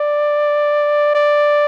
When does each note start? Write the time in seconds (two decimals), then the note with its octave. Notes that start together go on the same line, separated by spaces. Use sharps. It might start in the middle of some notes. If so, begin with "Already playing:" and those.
Already playing: D5
1.15 D5